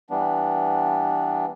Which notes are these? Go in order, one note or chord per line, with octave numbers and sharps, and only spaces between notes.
E3 G3 B3 D4